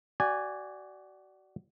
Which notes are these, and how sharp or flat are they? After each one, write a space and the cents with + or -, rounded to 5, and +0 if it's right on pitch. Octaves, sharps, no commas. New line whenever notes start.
F#4 +30 D5 +0 G#5 -10